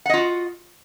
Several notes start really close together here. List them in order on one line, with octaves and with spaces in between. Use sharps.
F#5 D#5 F4 F#4